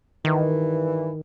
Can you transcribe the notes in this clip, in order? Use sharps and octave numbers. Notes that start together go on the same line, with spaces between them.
G2 D#3 E3